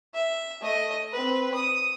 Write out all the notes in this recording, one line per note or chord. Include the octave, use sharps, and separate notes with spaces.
E5
A3 D#5
C4 B4
D#6